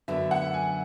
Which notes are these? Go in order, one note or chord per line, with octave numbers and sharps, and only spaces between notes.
F#2 D3 F#3 B3 E5
F#5
G#5